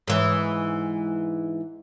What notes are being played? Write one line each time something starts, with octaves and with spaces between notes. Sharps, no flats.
G#2 E3